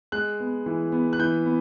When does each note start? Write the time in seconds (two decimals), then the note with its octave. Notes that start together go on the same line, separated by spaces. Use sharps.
0.12 G#3 F#6
0.40 B3
0.66 E3
0.92 B3
1.13 F#6
1.19 E3 G6
1.45 B3